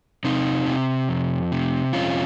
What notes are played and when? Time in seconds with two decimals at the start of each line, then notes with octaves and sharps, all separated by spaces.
0.24 C3 C4 D#4
0.67 C3
1.09 F2
1.52 C3
1.93 F2 C#4 F4